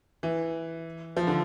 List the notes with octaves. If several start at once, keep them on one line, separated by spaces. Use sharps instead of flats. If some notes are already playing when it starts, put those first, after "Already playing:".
E3
F3
D3